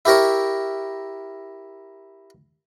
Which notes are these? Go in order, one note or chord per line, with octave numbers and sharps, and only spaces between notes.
E4 G4 A#4 C#5